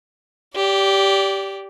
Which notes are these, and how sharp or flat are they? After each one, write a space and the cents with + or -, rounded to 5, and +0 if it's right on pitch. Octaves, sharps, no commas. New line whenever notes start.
G4 -5 D5 -25